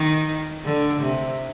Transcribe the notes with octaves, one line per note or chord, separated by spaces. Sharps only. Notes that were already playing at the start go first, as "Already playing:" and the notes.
Already playing: D#3
D3
C3